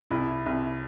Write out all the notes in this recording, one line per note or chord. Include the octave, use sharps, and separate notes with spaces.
C2 E4
C2